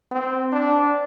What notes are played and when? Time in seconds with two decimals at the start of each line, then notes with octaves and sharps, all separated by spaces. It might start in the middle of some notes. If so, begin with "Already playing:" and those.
0.11 C4
0.52 D4